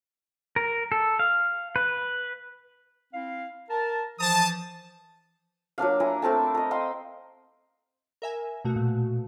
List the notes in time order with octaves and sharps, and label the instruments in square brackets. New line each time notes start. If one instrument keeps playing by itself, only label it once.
[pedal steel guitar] A#4
A4
F5
B4
[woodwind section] C4 E4 F5
A#4 A5
[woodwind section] E3 F3 [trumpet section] A5 D#6
[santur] F#3 A#3 D4 F5
E4 G#5 A#5
A3 C4 A#4 A5
D#5 A#5
D#5 F5 G5 C6
[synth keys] A#4 E5 G#5
B2 A3 F#4
[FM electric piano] A#2